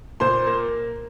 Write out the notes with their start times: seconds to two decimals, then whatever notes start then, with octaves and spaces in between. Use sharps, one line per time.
0.20 A#2 C5 C6
0.47 A#3